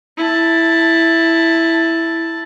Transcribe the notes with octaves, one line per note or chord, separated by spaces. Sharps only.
E4 A5